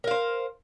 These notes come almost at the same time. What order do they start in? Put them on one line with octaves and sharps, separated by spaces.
A#4 F5 C5